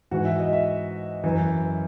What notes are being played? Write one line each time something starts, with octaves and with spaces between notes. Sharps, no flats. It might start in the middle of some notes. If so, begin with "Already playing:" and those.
G#2 E3 F#4
E5
D#5
E5
F#2 E3